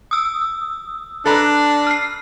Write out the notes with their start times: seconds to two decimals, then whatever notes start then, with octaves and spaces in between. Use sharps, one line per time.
0.11 D#6 E6
1.26 D4 A4 B4 A#5
1.87 F6 C7